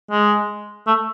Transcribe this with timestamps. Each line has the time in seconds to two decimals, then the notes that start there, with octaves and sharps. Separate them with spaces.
0.11 G#3
0.87 A3